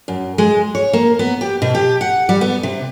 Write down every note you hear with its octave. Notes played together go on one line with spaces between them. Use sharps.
F#2
G#3
C#5
A#3
B3
G4
B2
G4
F#5
G3
B3
C3